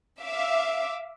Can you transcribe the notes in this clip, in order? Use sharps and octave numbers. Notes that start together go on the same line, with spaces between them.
E5 F5 D6